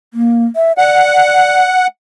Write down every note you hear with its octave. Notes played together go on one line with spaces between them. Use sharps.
A#3
E5
D5 F#5